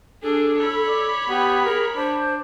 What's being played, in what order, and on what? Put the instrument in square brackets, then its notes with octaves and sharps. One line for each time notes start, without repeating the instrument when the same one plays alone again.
[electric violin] D4 G#4 [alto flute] A4
[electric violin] C#5 B5
[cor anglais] D5
[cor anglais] B3 [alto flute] G4
[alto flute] G#4 [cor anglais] A#4
[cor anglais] D4 [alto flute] C5